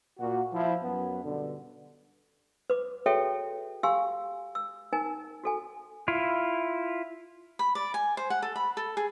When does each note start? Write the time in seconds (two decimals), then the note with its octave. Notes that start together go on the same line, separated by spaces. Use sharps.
0.19 A#2 F#4
0.53 F3 E4
0.82 F#2 B3
1.24 G2 B2 D3
2.70 B4 D6
3.06 F#4 G#4 A4 C#5 E5 G5
3.83 G4 F5 G#5 C6 E6
4.55 E6
4.93 D#4 A#4 G#5
5.44 F#4 A4 G#5
6.08 E4 F4
7.59 B5
7.75 D5
7.94 G#5
8.17 C5
8.30 F#5
8.42 A4
8.56 B5
8.77 A4
8.97 G#4